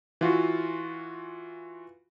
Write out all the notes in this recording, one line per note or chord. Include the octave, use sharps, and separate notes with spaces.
E3 F4 F#4